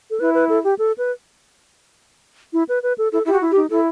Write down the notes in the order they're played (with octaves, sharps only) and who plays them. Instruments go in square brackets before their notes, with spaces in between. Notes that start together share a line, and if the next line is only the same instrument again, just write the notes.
[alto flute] A4
[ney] E4 [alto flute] B4
[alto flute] B4
A4
G4
A4
B4
E4
B4
B4
A4
[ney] E4 [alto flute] A4
[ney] E4
[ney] F#4 [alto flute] G4
[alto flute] E4
[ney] G4
[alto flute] D#4
[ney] E4 [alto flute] A4